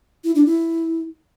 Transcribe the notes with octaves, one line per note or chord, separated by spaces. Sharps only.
E4
D4
E4